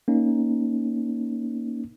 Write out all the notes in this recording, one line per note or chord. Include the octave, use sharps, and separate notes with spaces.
A#3 C#4 D#4